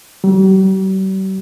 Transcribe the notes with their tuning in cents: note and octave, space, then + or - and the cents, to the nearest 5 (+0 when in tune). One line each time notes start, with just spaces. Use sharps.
G3 -45